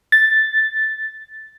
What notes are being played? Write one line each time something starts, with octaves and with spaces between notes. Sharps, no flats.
A6